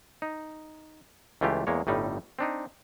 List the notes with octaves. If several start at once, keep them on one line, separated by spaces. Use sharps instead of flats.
D#4
C#2 E3 A3 F4 G4
E2 G#3 A#3 C#5
G1 A2 G3 D#4
C4 D4 D#4